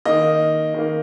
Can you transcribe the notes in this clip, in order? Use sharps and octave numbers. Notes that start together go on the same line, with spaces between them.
D#3 A#3 D#5
D#3 A#3